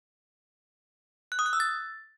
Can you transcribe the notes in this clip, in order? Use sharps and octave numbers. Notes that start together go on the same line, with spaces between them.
F#6
D#6
F#6
E6
A6